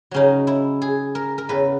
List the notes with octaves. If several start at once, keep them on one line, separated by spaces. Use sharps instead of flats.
C#3 F#3 C#4 D#4
E4
G#4
A#4
A#4
E2 C#3 E3 B4